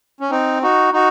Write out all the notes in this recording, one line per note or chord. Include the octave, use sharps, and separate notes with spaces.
C#4
C4 D#4
D#4 F#4
D#4 F#4